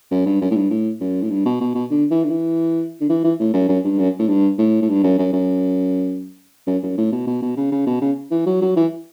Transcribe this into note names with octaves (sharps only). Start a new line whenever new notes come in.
F#2
G2
F#2
A2
G2
A2
F#2
A2
G2
B2
B2
B2
D3
E3
D3
E3
D3
E3
E3
A2
F#2
F#2
G2
F#2
A2
G2
A2
A2
G2
F#2
F#2
F#2
F#2
F#2
A2
B2
B2
B2
C#3
C#3
B2
C#3
E3
F#3
F#3
E3